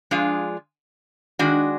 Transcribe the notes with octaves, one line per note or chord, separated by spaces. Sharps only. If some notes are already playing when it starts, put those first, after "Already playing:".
F3 G#3 D4 F4 G#4
D#3 G#3 D4 F#4